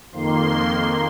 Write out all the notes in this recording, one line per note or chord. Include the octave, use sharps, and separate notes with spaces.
F2 D#3 A#3 C6